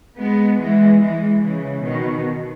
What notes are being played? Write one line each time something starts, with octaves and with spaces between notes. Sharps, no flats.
G#3 B3
E3 G#3
E3 G#3
C#3 E3
B2 D#3